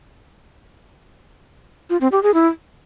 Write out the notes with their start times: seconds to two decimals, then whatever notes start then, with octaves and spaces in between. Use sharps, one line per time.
1.90 F4
2.01 C4
2.12 G4
2.23 G#4
2.34 E4